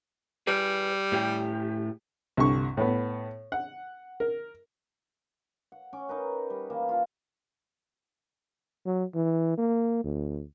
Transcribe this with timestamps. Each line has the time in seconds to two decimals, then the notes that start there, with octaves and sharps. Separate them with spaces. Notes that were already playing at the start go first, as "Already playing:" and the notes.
0.47 G3 G#4 B4
1.12 A2 G4
2.37 C2 G2 D3 C#6
2.77 A2 B3
3.52 F#5
4.20 A#4
5.72 F#5
5.93 C#4 G#5 D6
6.09 D#4 A#4 B4
6.50 G3
6.70 E3 G3 A#3
6.89 F4 A5
8.86 F#3
9.15 E3
9.58 A#3
10.04 D2